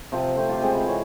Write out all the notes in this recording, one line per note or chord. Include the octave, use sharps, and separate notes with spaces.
C3 F3 C4
A3 C4 C5
F4 G4
G#3 C4
B5
E3 C#5